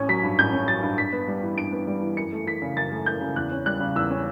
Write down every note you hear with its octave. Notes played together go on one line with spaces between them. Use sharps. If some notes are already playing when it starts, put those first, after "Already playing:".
Already playing: A1 C#4
F#3 B6
G2
A1 G6
C#4
F#3 A6
G2
G2 B6
B3
G3
E3
G2 D7
B3
G3
E3
F#2 C#7
A3
E3 B6
C#3
F#2 A6
A3
E3 G6
C#3
E2 F#6
C#4
G3 F#6
C#3
E2 E6
C#4